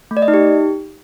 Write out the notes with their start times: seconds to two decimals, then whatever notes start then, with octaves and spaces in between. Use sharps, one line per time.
0.11 A3
0.17 D5
0.22 D#5
0.28 D#4
0.34 G4